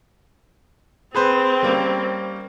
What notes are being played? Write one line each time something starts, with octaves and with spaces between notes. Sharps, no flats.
C4 G#4 B4 C5
G3 A#3 C#4